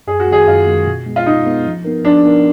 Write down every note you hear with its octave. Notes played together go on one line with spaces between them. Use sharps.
F#2 G#4
F#4
D#3 G#3 G#4
F#2 F4
D#3 G#3
B2
G#3 B3
F4
B2 D#4
G#3 B3
F3
B3 D#4 A#4
F3 D4
B3 D#4 A#4